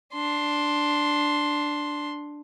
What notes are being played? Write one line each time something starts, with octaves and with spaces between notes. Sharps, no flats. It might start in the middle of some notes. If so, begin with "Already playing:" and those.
D4 C6